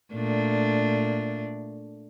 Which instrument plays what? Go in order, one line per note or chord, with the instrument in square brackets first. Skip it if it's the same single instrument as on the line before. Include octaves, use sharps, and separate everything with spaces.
[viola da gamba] A#2 A3 D4